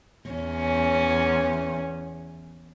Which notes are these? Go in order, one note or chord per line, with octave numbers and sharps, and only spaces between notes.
E2 C#4